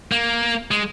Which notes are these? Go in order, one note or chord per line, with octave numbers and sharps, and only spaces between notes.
A#3
G#3